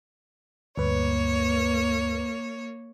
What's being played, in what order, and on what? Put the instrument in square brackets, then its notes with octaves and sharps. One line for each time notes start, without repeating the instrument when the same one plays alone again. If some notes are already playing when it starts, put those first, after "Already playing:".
[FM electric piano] D2 G2 B4 [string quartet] A#3 C#5